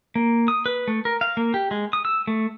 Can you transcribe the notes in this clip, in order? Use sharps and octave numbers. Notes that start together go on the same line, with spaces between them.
A#3
D#6
B4
A3
A#4
F5
A#3
G4
G#3
D#6
E6
A3